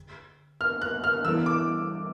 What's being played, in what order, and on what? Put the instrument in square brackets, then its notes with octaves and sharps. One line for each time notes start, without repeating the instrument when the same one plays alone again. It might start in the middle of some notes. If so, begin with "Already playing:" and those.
Already playing: [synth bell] D3
[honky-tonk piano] F6
F#6
F6
[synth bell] E3 G3 B3 E4 A4 [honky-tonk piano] E6
[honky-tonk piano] D6